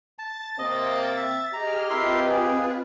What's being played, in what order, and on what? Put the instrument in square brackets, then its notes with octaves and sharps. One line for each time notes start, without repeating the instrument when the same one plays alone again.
[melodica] A5 [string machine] A6
[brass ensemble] C3 A#3 C4 [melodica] D#5
[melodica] E5
[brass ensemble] G4 D#5 [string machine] G#4 F6 [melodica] A#5
[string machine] C4 F4 B4 [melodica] E4 A#4 C6
[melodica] G#4